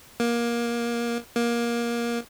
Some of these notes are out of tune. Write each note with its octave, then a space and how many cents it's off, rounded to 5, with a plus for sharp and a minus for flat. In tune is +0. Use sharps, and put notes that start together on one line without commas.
A#3 +20
A#3 +20